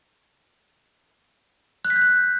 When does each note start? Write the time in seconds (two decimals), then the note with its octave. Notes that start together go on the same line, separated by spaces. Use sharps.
1.85 F#6
1.90 B6
1.96 G6
2.02 F#6